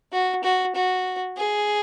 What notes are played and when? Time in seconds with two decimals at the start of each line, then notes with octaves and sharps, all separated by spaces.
0.12 F#4
0.43 F#4
0.75 F#4
1.37 G#4